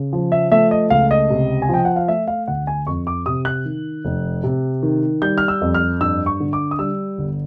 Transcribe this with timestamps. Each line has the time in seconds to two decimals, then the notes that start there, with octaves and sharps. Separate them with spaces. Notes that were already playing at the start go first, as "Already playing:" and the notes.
Already playing: C#3
0.13 F3
0.32 E5
0.51 A3 E5
0.71 D#5
0.90 C#2 F5
1.11 D#5
1.30 C3
1.62 G#5
1.69 F3 G5
1.85 F#5
1.96 F5
2.08 A3 E5
2.28 F5
2.48 D2 F#5
2.67 G#5
2.87 F2 C#6
3.07 D6
3.26 C3 D#6
3.45 F#6
3.65 D#3
4.05 F1
4.44 C3
4.83 D#3
5.22 G3 G6
5.38 F6
5.48 E6
5.61 F2
5.74 F6
6.01 G2 E6
6.26 C#6
6.40 D3
6.53 D6
6.71 D#6
6.79 G3 E6
7.18 G1